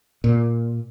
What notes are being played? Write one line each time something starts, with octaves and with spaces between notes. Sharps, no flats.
A#2